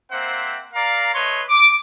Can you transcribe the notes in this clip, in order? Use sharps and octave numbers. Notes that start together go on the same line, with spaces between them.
A#3 C4 C5 E5 F#5
A#4 D5 F5 A#5
A3 B4 C#5 D#5 C6
D6